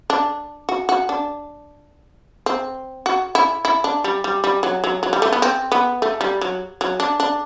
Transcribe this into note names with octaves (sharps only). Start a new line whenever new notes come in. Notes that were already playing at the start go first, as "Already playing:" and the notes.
D4
F#4
F#4
D4
C4
F#4
E4
E4
D4
G3
G3
G3
F#3
F#3
F#3
G3
A3
B3
C4
B3
A3
G3
F#3
F#3
D4
D4